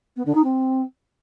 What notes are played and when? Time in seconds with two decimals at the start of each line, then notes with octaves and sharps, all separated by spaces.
0.16 B3
0.25 D3
0.34 D#4
0.43 C4